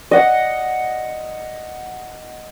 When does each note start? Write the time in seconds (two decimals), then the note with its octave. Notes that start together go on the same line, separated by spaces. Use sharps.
0.11 D#5 F#5